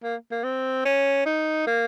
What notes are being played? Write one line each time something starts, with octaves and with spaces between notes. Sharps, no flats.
A#3
A#3
C4
C#4
D#4
A#3